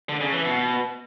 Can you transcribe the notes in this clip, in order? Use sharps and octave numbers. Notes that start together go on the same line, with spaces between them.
D3
C#3
E3
B2